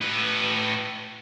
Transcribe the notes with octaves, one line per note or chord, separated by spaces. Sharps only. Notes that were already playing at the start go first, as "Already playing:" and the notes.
A2 B4